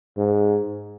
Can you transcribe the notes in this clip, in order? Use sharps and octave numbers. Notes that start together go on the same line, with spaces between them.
G#2